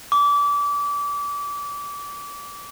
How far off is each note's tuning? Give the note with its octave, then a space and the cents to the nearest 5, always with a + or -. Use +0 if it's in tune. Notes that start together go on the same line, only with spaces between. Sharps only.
D6 -30